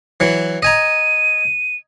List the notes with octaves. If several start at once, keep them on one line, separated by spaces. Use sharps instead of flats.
E3 F#3
D#5 G#5 A#5 D#7